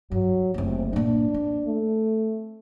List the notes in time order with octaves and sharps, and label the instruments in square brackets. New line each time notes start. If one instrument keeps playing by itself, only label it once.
[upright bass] G2 [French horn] F#3
[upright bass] F#1 D2 [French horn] C3
[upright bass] G2 A#2 [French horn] D4
[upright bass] C4
[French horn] A3